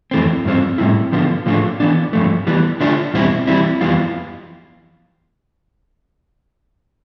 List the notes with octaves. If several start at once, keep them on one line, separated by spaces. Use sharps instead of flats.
F2 E3 A3 C4
G2 F3 C4
A2 G3 C4 E4
D3 F3 B3 F4
A2 F3 A3 D4 F4
E3 B3 D4
G2 F3 A3
E3 G3 B3
D3 A3 D4 F4
E2 B2 G3 C4 E4
E3 G3 C4 E4
F2 E3 G3 B3 F4